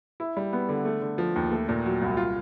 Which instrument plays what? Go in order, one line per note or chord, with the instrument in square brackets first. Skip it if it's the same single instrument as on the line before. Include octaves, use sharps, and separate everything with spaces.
[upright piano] E4
G3
B3
D3
A3
D3
F3
D#2
A3
A#2
F#3
C2
F4